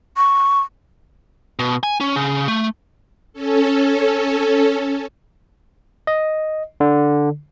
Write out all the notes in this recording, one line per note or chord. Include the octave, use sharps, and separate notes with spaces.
C#6
B2
G#5
C#4
C#3
A3
C#4 A4
D#5
D3